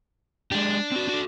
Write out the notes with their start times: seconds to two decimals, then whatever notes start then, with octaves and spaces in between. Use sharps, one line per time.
0.51 G#3 D4 G4
0.92 C4 F#4
1.09 F#4 A4